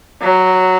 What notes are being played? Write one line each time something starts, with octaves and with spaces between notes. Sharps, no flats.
F#3